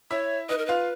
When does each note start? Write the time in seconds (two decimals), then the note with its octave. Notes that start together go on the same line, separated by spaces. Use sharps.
0.11 E4 C#5 E5
0.49 D#4 B4 D#5
0.58 A#4
0.66 F4 B4 F5